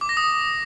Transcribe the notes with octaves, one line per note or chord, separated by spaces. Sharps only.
D6
A#6
D#6